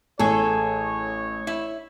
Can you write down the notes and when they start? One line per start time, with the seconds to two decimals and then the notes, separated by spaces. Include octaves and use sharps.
0.19 A1 G#4 A4 C#5
1.47 E4